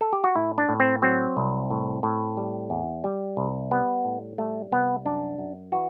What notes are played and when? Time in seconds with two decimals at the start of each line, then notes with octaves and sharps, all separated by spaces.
0.01 A4
0.13 G4
0.24 F#4
0.36 A2 E4
0.58 D4
0.69 A2
0.80 C4
1.02 F#3 C4
1.37 C2
1.70 A2
2.03 A2
2.37 G3
2.70 E2
3.04 G3
3.37 C2
3.71 G3 B3
4.05 A2
4.38 G3 A3
4.72 C2 B3
5.05 F#2 D4
5.38 F#2
5.72 E3 F#4